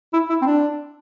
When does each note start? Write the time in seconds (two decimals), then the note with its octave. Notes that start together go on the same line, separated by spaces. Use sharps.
0.13 E4
0.30 E4
0.42 C4
0.46 D4